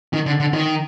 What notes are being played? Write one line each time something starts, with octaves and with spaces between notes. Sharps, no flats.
D#3
D3
D3
D#3